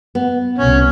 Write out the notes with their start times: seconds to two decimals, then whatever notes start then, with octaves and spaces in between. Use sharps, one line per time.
0.15 B3
0.58 C2 B2 C#4